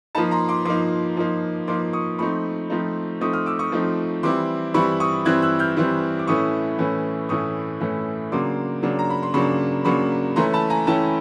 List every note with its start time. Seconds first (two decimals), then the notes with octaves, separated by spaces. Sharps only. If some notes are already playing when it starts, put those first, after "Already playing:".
0.15 F3 A#3 D#4 A5 B5
0.31 A#5 C6
0.48 C6 D6
0.65 F3 A#3 D#4 C6 D6
1.17 F3 A#3 D#4
1.67 F3 A#3 D#4 C6 D6
1.93 C#6 D#6
2.18 F3 A3 C4 D#4 B5 C#6
2.70 F3 A3 C4 D#4
3.21 F3 A3 C4 D#4 C#6 D#6
3.33 D#6 F6
3.46 D6 E6
3.59 C#6 D#6
3.72 F3 A3 C4 D#4
4.23 E3 G3 C4 E4 C6 D6
4.74 E3 G3 C4 E4 B5 C#6
5.00 C#6 D#6
5.25 E3 G3 C4 E4 F#6 G#6
5.42 E6 F#6
5.59 F6 G6
5.77 E3 G3 C4 E4
6.19 D6
6.27 A2 E3 A3 C#4 E4 C#6 D#6
6.78 A2 E3 A3 C#4 E4
7.29 A2 E3 A3 C#4 E4 C#6 D#6
7.81 A2 E3 A3 C#4 E4
8.31 C#3 F#3 A#3 D4 C6 D6
8.83 C#3 F#3 A#3 D4
8.99 A#5
9.10 B5
9.23 C6
9.34 C#3 F#3 A#3 D4 B5 C#6
9.85 C#3 F#3 A#3 D4 B5 C#6
10.36 E3 A3 C#4 E4 A#5 C6
10.53 A5 B5
10.70 G#5 A#5
10.87 E3 A3 C#4 E4 G5 A5